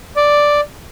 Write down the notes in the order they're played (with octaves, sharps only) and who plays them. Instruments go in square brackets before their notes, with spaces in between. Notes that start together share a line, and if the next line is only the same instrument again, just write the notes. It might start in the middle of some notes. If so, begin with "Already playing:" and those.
[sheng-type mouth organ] D5